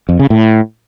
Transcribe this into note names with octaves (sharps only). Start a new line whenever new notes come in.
F2
C#3
A2